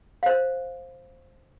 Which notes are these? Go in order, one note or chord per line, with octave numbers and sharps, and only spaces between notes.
C5 F5